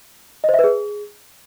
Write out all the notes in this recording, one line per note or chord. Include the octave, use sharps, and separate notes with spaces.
D#5
C5
E5
B4
G#4